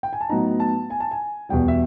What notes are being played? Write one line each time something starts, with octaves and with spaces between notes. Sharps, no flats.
G5
G#5
A5
A2 F#3 B3 D#4 A#5
A5
G#5
A5
G#5
E2 B2 G3 G5
E5